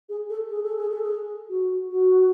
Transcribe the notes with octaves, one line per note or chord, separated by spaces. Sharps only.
G#4
A4
G#4
A4
G#4
A4
G#4
F#4
F#4